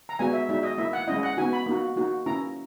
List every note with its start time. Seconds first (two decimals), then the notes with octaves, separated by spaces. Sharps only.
0.09 A#5
0.19 G#3 B3 F#4 G#5
0.33 E5
0.49 G#3 D#4 F#4 E5
0.63 D#5
0.78 A#3 E4 E5
0.93 F#5
1.08 G#3 C#4 E4 D#5
1.23 F#5
1.37 B3 D#4 F#4 G#5
1.53 B5
1.66 A#3 D#4 F#4
1.96 A#3 D#4 F#4
2.26 A#3 C#4 E4 A#5